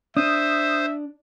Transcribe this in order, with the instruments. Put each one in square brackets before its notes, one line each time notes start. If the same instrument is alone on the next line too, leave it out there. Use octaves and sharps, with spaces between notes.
[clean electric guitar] D4 [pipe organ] C5 [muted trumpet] E5 [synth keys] D#6